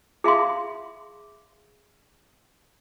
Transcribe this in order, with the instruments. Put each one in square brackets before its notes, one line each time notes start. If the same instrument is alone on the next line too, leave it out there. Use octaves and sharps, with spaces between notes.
[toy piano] G#4 E5 F5 C6